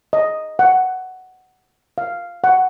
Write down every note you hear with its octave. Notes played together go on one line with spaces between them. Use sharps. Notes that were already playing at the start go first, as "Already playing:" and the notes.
D#5
F#5
F5
F#5